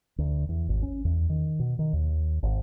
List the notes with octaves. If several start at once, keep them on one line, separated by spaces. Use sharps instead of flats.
D2
E2
G#1
C#4
E2
D#3
B2
D#3
D#2
G#1